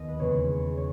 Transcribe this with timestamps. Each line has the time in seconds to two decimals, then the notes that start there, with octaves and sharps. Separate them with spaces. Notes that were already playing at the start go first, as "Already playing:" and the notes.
Already playing: D#2 B3 D#5
0.09 B4
0.20 E2 C#3 G#3 C#5
0.77 C#5